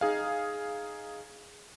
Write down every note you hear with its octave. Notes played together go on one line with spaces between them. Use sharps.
D#4 G#4 F5